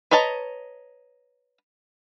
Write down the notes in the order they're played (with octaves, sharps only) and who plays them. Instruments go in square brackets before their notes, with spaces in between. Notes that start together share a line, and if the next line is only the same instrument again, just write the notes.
[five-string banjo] B4 C#5 D#5 A5 A#5